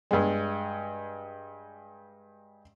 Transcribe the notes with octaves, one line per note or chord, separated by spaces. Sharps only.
G2 G#3